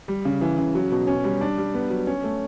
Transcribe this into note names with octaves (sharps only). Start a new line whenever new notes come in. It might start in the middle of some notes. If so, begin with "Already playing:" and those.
G3
C#3
E3
C#3
F#3
B2
C#4
G3
D4
G3
B3
F#3
C#4
A3